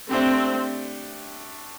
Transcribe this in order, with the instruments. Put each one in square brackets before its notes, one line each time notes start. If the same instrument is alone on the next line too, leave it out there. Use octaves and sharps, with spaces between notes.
[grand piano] A3 D4 G4 [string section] C4